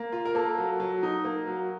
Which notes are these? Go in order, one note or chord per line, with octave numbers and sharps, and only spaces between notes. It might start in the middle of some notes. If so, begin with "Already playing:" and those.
Already playing: A#3
F4
A#4
A#3 A4
F#3
F#3
D#4
A#3
F#3